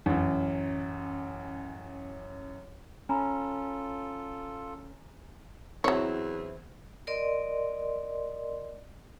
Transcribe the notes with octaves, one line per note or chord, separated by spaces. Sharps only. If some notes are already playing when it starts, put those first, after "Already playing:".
A1 F#2
C#4 F4 A4 G#5 A#5 B5
E2 F#3 C4 E4 C#5
A#4 D5 D#5 C6